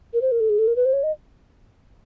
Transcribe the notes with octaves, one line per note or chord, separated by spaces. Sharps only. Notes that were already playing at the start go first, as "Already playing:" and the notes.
A#4
C5
A#4
A4
G#4
A4
A#4
B4
C5
C#5
D#5